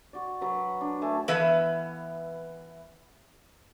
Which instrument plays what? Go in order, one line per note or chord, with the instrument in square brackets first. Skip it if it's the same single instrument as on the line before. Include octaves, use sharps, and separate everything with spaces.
[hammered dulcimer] F#4 D5
F#3 B4
D4
A3 G#5 A5
[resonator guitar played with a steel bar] E3 B3 B4 E5 F5